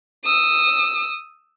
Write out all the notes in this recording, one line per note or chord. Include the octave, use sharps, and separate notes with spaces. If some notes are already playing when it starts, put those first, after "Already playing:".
D#6 E6